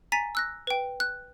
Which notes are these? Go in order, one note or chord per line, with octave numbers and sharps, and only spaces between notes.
G#5 A#5 A6 B6 D#7
E6 F#6 A#6
B4 G5
F#6